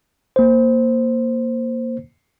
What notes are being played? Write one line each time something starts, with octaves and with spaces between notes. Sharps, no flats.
A#3 C5